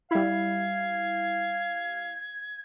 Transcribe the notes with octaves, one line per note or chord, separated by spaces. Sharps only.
G3 E4 F5 G#6